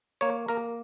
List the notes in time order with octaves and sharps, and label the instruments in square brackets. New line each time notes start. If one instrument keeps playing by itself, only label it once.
[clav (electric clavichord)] A#3 C#5
A#3 A#4